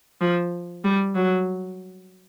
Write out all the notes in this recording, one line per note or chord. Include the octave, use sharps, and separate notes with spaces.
F3
G3
F#3